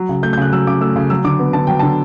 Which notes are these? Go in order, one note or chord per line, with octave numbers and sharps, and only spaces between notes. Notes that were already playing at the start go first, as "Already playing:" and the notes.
Already playing: F#3
C#3
A3 G6
G6
C#3 F#6
F#3 E6
C#3 D6
A3 E6
C#3
F#3 E6
D3 D6
B3
D3 A5
F#3 G5
D3 A5